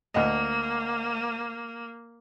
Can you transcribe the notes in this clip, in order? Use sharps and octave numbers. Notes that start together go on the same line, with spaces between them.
D2 A#3 D#5